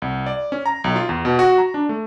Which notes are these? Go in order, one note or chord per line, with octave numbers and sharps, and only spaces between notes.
C2
D5
C#4
A#5
B1
F4
E2
B2
F#4
A#5
D4
A3